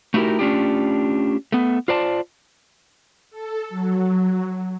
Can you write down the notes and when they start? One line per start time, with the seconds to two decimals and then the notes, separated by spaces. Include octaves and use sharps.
0.14 A3 D#4 E4 F#4 G4 A#4
0.39 A3 C#4 D4 F4 G4
1.52 A3 B3
1.88 F4 C5 D5 A5
3.30 A4
3.69 F#3